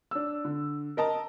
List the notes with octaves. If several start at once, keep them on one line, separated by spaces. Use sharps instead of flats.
D4 E6
D3
A#4 D#5 A5 A#5